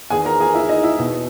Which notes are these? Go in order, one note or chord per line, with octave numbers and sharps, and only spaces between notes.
E2 D#3 G#4 G#5
A#4 A#5
G#4 G#5
E4 E5
D#4 D#5
E4 E5
E2 B2